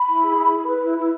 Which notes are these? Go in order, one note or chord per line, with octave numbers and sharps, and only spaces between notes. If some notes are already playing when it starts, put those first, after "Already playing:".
Already playing: B5
E4
G#4
E4
G#4
B4
E4
E4